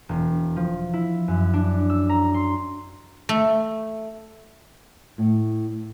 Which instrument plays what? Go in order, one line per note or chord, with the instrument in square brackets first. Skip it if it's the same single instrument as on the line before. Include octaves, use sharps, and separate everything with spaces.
[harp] E1
F3
E4
F#2
D4
E6
A#5
C6
[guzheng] A3
[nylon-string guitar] A2